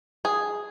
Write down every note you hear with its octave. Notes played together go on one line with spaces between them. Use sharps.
G#4